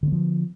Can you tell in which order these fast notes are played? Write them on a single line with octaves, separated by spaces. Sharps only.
D3 B3 F3